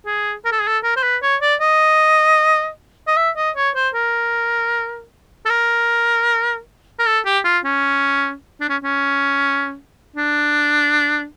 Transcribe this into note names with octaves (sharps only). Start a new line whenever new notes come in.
G#4
A#4
A4
G#4
A4
A#4
C5
B4
C#5
D5
D#5
D#5
E5
D#5
C#5
C5
A#4
A4
A#4
A#4
A4
G4
F4
C#4
D4
C#4
C#4
D4